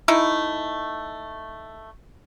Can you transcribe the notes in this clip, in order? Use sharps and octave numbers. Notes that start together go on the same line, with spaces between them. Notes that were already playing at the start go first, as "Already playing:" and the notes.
A3 D#4 E4